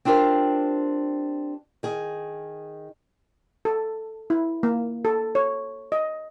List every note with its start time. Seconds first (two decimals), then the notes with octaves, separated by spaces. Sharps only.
0.05 C4 D4 F4 G4 A#4 C5
1.83 D#3 G#4
3.65 A4
4.30 E4
4.63 A#3
5.05 A4
5.35 C#5
5.92 D#5